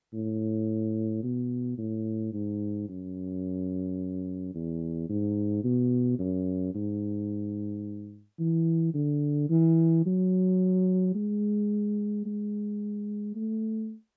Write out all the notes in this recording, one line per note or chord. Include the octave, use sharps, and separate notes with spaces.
A2
B2
A2
G#2
F#2
E2
G#2
B2
F#2
G#2
E3
D3
E3
F#3
G#3
G#3
A3